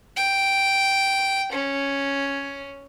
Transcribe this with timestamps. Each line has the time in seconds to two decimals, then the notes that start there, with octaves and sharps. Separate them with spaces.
0.17 G5
1.52 C#4